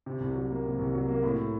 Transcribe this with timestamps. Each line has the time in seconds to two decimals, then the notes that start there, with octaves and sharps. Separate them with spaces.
0.06 C3
0.20 C2
0.36 F#3
0.51 A#3
0.65 C3
0.79 C2
0.94 F#3
1.08 A#3
1.23 A2